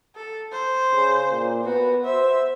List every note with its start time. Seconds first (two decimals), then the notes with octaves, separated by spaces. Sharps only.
0.16 A4
0.51 C5
0.93 C#3
1.29 A#2
1.65 B3 F#4
2.05 C5 E5